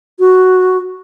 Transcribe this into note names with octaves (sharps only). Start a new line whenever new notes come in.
F#4